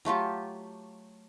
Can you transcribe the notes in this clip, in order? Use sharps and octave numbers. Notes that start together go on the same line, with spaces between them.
F#3 A3 F4 G4